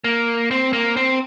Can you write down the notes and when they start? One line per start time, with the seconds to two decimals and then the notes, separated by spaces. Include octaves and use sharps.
0.04 A#3
0.51 C4
0.73 A#3
0.97 C4